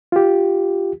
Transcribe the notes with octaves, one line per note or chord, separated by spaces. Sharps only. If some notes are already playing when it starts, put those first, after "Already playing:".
F4 G4